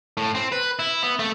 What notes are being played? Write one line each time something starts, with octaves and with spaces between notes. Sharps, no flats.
A2
C4
B4
E4
B3
A3